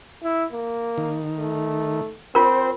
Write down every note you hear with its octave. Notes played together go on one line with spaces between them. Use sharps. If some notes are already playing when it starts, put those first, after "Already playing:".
E4
A#3
D#3
A3
C4 F4 A#4 C5